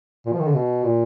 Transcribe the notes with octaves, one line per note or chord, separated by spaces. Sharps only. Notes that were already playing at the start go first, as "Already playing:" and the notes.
A#2
F3
D#3
D3
B2
A#2